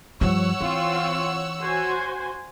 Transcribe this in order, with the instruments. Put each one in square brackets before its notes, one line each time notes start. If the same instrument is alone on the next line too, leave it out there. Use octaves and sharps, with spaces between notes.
[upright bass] G2 F3 [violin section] C#5 F#5 E6
[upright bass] E3 [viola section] C4 F4
[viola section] F#4 C5 G#5